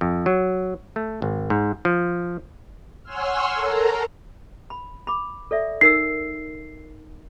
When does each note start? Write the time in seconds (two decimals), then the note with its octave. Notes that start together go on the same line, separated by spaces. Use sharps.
0.01 F2
0.26 F#3
0.96 A3
1.22 G#1
1.50 G#2
1.85 F3
3.03 C#5 F#5 G#5 C6 E6 F6
3.54 A4 A#4 A#5
4.70 B5
5.07 B5 D6
5.51 A4 D5 E5
5.81 D#4 A#4 E6 C7